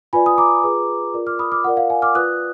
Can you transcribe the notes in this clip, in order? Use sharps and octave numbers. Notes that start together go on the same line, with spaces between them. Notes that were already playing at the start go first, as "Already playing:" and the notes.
F4 B4 D5 G#5 B5
D#6
A#5 D6
F4 G#4 B4
F4 A#4 D5
D6 F6
B5 D#6
D6 F6
F4 A#4 D5 F#5
F5
F5 G#5
D6 F6
F4 B4 D5 D#6 F#6